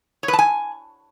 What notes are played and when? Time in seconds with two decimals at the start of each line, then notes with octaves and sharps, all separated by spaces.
0.23 C#5
0.28 B4
0.33 A5
0.39 G#5